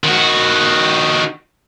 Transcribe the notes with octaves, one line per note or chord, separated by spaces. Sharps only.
D#3 F#4